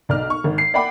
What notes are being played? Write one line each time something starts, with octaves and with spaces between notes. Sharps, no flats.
B1 D5 D#5 F6
C#6
G#1
C7
D5 E5 F#5 G5 B5 D6